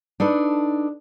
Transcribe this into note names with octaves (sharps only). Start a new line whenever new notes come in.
D4 D#4 A4 B4